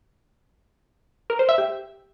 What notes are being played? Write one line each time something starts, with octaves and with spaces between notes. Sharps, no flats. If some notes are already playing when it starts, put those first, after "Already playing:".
A#4
C5
E5
G4